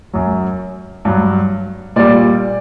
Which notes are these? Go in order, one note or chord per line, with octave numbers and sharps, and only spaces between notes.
F#2 F#3
G2 F#3
A#2 G3 D5